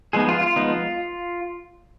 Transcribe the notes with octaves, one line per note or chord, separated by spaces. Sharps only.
F3 G#3 B3 D#4 G#4
F4
F4
F3 G#3 B3 D#4